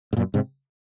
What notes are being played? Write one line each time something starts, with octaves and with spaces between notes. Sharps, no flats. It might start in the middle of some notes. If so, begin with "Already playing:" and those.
G#2
F#2 A#2
G#2 C3